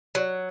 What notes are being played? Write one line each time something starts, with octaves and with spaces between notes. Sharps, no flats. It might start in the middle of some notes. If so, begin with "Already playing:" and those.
F#3